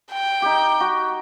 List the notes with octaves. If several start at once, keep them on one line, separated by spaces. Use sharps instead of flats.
G5
D#4 G4
F#4